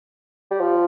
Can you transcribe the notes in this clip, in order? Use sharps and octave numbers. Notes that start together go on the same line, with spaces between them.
G3
F3